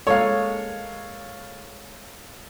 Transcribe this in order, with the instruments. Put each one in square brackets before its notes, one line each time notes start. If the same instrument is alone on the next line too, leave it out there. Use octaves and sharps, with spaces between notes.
[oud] G#3 A#3 C#4 [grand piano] A4 F5 [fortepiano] C#5